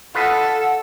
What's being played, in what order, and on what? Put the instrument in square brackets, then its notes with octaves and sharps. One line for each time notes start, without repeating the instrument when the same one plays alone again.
[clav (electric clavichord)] F4 B4 D#5 [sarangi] A4 [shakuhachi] F#5